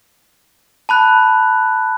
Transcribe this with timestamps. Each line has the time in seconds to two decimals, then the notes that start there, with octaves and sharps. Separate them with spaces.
0.89 A5 B5 F#6